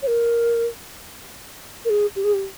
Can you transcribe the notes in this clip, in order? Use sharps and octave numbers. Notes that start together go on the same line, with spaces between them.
C#5
A#4
A#4
G#4
G4
G#4
G4